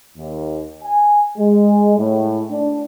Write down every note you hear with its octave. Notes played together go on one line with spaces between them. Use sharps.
D#2
G#5
G#3
A2
D4